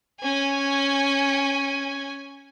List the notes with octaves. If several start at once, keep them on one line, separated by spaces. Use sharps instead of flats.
C#4 G#5